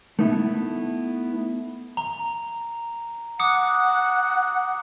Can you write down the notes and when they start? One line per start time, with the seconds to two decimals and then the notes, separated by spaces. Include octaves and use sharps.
0.19 A3 B3 D#4 E4
1.97 A#5
3.39 F#5 D6 D#6 C#7